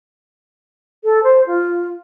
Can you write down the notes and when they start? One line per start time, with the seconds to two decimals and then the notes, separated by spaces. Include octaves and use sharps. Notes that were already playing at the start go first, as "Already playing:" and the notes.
1.04 A4
1.24 C5
1.47 F4